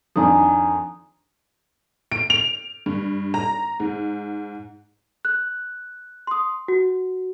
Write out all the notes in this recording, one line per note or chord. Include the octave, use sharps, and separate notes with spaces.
F2 D#3 D4 G#5 A#5 D#6
D7
F7
G2
A#5
G#2
F#6
C6 D#6
F#4